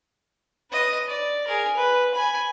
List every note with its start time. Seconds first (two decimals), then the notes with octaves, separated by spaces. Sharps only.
0.71 B4 D#5
1.07 D5
1.47 G#4 A#4
1.75 B4
2.14 G#5 B5